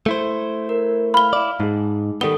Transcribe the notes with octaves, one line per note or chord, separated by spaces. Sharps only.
A3 E4 C5
A#4
F5 B5 F6 G7
E4 D5
G#2 D#4 G#4
D#3 G3 B3 A4 D#6 G7